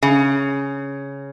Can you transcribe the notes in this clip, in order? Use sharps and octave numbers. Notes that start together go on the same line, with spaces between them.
C#3